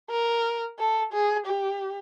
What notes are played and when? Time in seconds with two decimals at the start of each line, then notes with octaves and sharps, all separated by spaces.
0.10 A#4
0.79 A4
1.13 G#4
1.46 G4